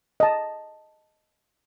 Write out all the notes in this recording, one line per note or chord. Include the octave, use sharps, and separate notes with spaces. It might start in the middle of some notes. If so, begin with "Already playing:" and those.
D#5 A5